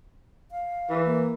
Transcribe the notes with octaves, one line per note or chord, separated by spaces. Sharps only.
F5
E3
A#3